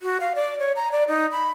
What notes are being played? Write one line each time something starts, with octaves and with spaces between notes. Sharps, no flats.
F#4
F5
D5
C#5
A#5
D5
D#4
B5